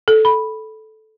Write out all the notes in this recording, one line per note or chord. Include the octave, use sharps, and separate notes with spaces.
A4
B5